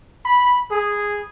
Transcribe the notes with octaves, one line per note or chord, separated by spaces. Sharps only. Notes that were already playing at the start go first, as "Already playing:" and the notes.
B5
G#4